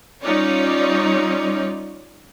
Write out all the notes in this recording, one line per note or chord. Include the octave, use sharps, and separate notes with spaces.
G3 C#4 D#4 F4 C#5 D5